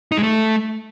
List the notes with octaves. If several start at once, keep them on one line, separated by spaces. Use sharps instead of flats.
D#4
G#3
A3